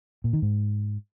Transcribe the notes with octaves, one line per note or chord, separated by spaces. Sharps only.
A#2
D#3
G#2